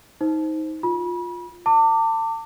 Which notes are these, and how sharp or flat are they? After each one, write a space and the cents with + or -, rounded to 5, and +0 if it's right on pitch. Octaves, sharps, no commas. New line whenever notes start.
D#4 +20 C5 +0
F4 +15 B5 -35
A5 +40 D6 +0